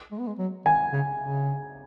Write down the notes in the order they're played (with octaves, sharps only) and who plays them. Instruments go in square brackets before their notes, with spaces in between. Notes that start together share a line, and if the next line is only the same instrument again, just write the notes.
[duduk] G#3
B3
G#3
F#3
[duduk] D#3 [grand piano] G#5
[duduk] C#3
C#3